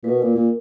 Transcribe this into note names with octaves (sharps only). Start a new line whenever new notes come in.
A#2 B4
B2 A#4
A#2
A#2